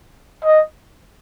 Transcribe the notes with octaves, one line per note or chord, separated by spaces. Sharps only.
D#5